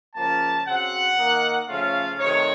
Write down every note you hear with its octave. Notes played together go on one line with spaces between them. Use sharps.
C#3 F3 A#3 C#4 A5
C#3 F#3 C4 F#5
D#3 A#3 D#4
C#3 F3 A3 C#4 F4 F5
C3 D#3 A3 D#4 C#5